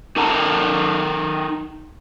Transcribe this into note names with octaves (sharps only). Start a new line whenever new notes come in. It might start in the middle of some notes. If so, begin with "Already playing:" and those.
D#4 A4 A#4 F#5 A5 A#5